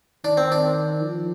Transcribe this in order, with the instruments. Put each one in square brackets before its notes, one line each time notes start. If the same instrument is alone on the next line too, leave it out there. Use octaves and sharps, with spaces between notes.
[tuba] D#3 [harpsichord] D4
[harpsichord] C4
D4
[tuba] F3